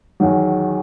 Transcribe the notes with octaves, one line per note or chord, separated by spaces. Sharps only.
E2 D#3 F#3